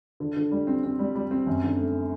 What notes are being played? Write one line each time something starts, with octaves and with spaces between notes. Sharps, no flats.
D3
D3
G3
C4
C4
G3
G3
C4
F#2
D3
A3